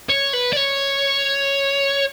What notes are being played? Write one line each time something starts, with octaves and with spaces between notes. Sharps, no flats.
C#5
B4
D5
C#5